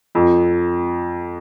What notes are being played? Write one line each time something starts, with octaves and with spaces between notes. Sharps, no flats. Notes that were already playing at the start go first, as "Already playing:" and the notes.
F2